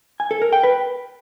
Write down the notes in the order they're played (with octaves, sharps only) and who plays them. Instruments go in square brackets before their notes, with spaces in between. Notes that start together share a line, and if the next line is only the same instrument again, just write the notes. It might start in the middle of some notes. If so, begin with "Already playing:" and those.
[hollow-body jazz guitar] G#5
A4
A#4
G5
B4